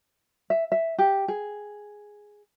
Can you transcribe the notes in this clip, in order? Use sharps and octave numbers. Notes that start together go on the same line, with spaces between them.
E5
E5
G4
G#4